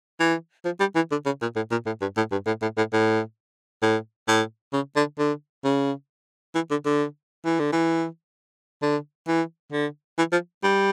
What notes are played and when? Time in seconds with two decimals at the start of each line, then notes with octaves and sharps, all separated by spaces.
0.20 E3
0.65 F3
0.80 G3
0.96 E3
1.11 D3
1.26 C#3
1.41 A#2
1.56 A2
1.71 A#2
1.86 A2
2.01 G2
2.17 A2
2.32 G2
2.46 A2
2.62 A2
2.77 A2
2.93 A2
3.83 A2
4.28 A2
4.73 C#3
4.96 D3
5.19 D3
5.64 C#3
6.55 E3
6.71 D3
6.85 D3
7.45 E3
7.60 D3
7.72 E3
8.82 D3
9.28 E3
9.72 D3
10.18 E3
10.32 F3
10.63 G3